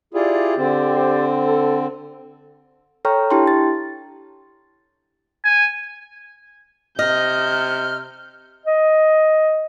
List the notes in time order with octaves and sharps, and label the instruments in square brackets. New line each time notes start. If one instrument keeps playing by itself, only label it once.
[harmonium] E4 F4 G#4 [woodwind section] G4 D5
[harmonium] D3 C4
[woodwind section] G4 C5 D5
A4
[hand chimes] A4 C#5 G5 A#5 C#6 F6
D4 E4 G4 G5 A5 C6
A6
[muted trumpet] G#5
[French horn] C3 [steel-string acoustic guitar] D#5 [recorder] F6 [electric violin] G6
[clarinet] D#5